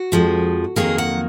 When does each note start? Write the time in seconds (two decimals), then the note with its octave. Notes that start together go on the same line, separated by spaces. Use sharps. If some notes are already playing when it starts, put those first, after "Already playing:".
Already playing: F#4
0.12 F2 F3 G#3
0.76 F2 D#3 F#3 A#3 G#4
0.98 F#5